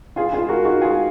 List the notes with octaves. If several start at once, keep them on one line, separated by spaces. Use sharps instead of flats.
F4 G#4
F4 G#4
F#4 A#4
D#4 F#4
F4 G#4